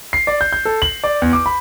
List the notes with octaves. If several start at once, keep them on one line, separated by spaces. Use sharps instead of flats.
C7
D5
G6
G6
A4
F#7
D5
E2
D6
B5